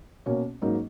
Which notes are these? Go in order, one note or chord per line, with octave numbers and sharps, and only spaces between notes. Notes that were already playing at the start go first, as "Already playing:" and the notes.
B2 A#3 C#4 F#4 C#5
G#2 F#3 A#3 D#4